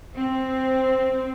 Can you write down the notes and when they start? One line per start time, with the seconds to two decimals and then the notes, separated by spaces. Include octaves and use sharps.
0.15 C4